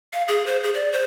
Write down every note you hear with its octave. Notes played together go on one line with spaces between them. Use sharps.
F5
G#4
C5
G#4
D5
C5